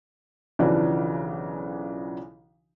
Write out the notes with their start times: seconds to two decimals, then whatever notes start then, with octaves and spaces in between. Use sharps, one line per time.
0.59 B1 C#3 E3 F3 D4